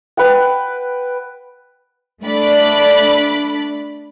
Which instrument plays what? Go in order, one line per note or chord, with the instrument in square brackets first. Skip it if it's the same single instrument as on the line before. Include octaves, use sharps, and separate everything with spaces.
[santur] B4 F#5 G5
[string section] A3 D4 D5 B5